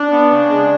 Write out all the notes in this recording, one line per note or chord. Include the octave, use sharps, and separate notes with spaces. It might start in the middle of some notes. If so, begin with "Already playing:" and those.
Already playing: D4
B3
C#3
G#3